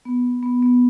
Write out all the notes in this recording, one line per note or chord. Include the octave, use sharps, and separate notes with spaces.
B3
B3
B3